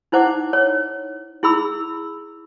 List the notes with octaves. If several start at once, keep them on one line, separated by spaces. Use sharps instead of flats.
D#4 E4 C5 F#5 D6
C#5
E4 G#4 B5 E6